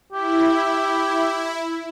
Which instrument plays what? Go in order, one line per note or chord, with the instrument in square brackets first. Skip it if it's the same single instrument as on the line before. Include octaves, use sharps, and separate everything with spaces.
[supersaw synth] E4 [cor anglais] G4